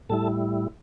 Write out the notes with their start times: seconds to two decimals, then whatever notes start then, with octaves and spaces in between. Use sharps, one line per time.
0.09 A2 G3 E4 A4 A5